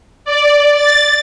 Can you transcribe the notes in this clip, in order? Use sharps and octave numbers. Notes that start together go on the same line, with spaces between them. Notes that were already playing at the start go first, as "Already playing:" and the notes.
D5
A6